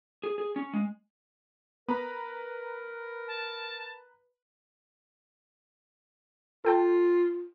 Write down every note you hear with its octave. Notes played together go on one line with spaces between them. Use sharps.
G#4
G#4
C#4
G#3
B3 A#4 B4 A#5 B5
A5
F4 A4 G5 A5